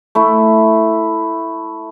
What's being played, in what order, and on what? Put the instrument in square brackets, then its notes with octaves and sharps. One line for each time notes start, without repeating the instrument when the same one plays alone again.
[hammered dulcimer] A3 E4